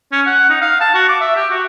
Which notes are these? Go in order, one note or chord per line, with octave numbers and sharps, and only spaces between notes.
C#4
F#5
D#4
F5
A5
F#4
D6
E5
G4
F#4